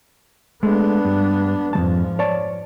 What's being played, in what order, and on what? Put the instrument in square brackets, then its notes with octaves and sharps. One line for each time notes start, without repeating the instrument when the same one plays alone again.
[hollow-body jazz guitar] G#3 A3 [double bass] B3 D4
[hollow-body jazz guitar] G2
[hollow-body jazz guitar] F2 F#3 A5 [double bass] G#2 F3
[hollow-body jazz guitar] C#5 D5 A5